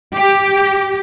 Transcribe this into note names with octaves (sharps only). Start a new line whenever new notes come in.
G4